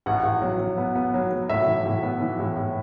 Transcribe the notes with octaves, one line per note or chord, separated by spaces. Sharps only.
A1 F#5
A1
F#3
F#3
B3
B3
F#3
F#3
A2 E5
E3
A2
B3
E3
A2
A2